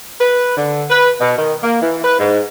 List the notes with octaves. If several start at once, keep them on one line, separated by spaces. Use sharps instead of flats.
B4
D3
B4
B2
D#3
A#3
E3
B4
G#2